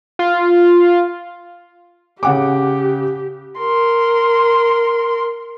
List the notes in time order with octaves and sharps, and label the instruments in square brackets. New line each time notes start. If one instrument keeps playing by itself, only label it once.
[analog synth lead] F4
[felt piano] C#3 F#5 D6 [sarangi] G4
[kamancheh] A#4 C6